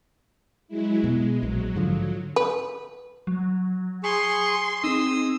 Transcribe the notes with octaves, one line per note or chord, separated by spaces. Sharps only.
F#3 G#3 E4
B2 G#3
A#1 F#3
G#2 D3 F3
B4
F#3
G#4 C6 C#6
C4 D#4 G#4 D#6 E6